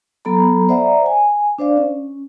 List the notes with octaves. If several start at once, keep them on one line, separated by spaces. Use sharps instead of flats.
F#3 B3 A4 A#5 B5
C5 D5 E5 F#5 A#5
G#5
D4 C5 D5 F5
C#4